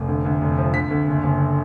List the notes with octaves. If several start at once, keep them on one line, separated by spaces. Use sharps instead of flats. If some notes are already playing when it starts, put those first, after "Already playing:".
Already playing: F1
D2
D2
F1
F3
D2 B6
D2
F#1
F#1